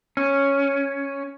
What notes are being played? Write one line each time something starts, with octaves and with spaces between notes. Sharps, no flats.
C#4